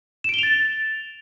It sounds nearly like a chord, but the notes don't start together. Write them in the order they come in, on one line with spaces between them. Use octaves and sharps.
E7 D7 G7 F7 A6